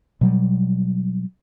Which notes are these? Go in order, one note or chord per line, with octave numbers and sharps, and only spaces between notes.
B2 F#3 G3